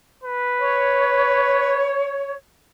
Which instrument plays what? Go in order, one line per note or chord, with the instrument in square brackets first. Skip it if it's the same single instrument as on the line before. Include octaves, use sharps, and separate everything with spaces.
[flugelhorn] B4
[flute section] C#5